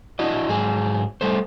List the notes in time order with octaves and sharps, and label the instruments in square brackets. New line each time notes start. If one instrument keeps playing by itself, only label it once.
[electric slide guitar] D4 E4 F#4 D#5
G#2 F#3 G#4
G3 A3 C5